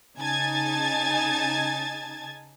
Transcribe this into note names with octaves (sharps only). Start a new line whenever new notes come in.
C#3 D#4 G#5 A5 G#6 A6